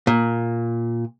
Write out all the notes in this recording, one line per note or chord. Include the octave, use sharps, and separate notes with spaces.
A#2